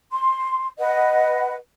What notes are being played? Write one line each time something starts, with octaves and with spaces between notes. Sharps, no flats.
C6
B4 D#5 F#5